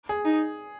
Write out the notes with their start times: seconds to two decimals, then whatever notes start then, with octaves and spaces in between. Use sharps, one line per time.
0.09 G#4
0.25 D#4